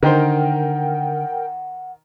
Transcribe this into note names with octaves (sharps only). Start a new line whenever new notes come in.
D3 D#3 A#4 C5 F#5 G5